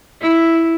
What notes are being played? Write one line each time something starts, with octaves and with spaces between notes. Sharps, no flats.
E4